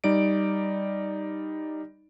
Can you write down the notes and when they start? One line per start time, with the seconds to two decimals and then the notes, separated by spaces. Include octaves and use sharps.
0.04 G3 D#4 D5 D7